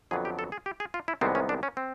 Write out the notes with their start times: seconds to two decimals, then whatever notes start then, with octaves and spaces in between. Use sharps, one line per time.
0.11 F2 D3 F#3 B3 G#4
0.25 G4
0.39 A4
0.52 G#4
0.66 G4
0.80 G#4
0.94 F4
1.08 E4
1.21 C2 C3 D#3 G#3 B3 C4
1.35 C#4
1.49 D4
1.63 C#4
1.77 C4